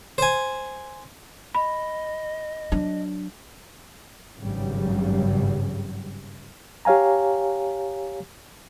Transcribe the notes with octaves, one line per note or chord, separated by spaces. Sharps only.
C5 G#5
D#5 B5
F#3 D4
G#1 G2 C#3 F#3 G3
G4 C#5 F5 G#5 A#5